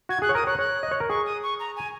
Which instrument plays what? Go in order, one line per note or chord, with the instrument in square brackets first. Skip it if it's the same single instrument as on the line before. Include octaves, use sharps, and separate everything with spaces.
[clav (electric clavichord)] F#4 [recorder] G#6
[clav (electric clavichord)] G#4 [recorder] F#6
[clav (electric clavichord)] C#5
[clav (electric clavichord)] A#4 [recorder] D#6
[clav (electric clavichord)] C#5 [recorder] F#6
[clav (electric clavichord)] C#5 [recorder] F#6
[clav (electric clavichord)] D#5
C#5
A#4
[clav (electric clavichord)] G#4 [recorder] C#6
[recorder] D#6
C#6
A#5
G#5